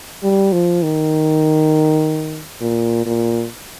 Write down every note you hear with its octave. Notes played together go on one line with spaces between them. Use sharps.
G3
F3
D#3
A#2
A#2